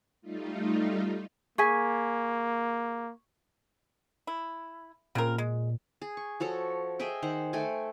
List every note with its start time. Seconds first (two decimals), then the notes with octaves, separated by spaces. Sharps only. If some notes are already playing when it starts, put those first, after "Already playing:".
0.21 G3 A3 D#4 F4
1.58 A#3 G#4 G#5 C#6 G#6 B6
4.27 E4
5.15 A#2 C#3 C4 A#4
5.38 G#3
6.02 G#4
6.17 C#6
6.40 F3 F#4 A4 C#5
6.99 G#4 D#5 E5 G5
7.22 D#3 C5 F#5
7.53 A3 A4 G5 G#5